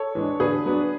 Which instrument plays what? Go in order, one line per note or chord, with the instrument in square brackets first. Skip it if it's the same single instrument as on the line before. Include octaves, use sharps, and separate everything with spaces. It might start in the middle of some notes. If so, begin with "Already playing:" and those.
Already playing: [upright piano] A4 C#5
E3 G#3 D4
D3 G#4 B4
F#3 B3 D4